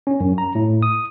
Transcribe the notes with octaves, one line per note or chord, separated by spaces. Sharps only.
C#4
F#2
A#5
A2
D#6